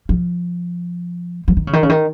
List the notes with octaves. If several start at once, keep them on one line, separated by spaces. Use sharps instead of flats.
F3
F3
D#3
C#3
D#3
C#3
D#3